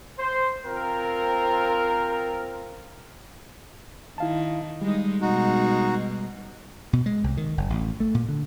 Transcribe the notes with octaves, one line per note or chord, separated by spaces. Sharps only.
C5
C4 F4 A#4
D#3 E4 F5 A5
G3 G#3 D#4
B2 G#3 D#4 F#4
B2
G#3
C2
D#3
F#1
A1
A3
A#2
D3